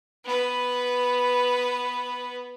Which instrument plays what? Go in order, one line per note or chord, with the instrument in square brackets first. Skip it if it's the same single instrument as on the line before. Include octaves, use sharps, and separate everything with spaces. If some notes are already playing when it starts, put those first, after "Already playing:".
[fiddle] B3 B4